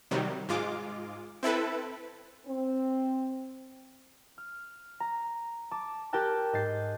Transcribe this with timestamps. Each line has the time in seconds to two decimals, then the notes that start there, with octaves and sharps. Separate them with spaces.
0.11 C3 D#3 F#3 G3
0.49 G#2 G#3 F4 D6
1.43 C4 E4 A4 B4
2.47 C4
4.38 F6
5.00 A#5
5.71 A5 D6
6.13 G4 A#4 G5 A5 F#6
6.53 G#2 D#5 G6 A6 C7